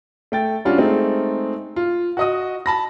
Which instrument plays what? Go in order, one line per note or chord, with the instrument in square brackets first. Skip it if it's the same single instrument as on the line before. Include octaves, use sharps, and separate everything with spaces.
[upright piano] A3 G5 A6
G3 C#4 D4 F4 F#4
G#3 A3 C4 D#4
F4
F#4 D#5 D#6
A5 B5 A#6